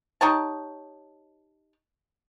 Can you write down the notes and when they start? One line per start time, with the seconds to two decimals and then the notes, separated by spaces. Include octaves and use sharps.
0.21 D#4 G4 C#5 A5